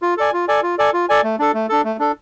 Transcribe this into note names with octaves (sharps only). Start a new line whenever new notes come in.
F4
A4 D5 G#5
F4
A4 D5 G#5
F4
A4 D5 G#5
F4
A4 D5 G#5
A3
D4 A4
A3
D4 A4
A3
D4 A4